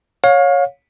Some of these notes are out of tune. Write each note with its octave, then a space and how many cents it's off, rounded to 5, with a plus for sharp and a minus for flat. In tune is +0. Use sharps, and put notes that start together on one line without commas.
C#5 +0 F5 +30